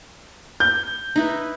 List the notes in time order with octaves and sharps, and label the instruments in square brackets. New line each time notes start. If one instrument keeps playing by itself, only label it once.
[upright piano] G6
[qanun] D#4 E4 B4